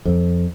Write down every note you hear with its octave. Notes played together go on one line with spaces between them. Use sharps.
F2